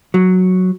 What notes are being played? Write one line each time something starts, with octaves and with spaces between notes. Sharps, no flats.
F#3